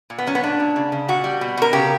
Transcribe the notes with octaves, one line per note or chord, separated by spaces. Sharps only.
A#2
B3
F#3 C#4
B3
A#2 D4
A#2
C#3
C#3
A#2 F#4
G3
B2
B2 A#4
C#3 G4